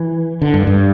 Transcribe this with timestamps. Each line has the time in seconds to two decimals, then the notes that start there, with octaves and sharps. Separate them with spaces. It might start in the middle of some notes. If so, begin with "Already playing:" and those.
Already playing: E3
0.42 D3
0.54 G2
0.67 G2